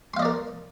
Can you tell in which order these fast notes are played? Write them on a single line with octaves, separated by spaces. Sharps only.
C6 F5 D#5 D5 A#4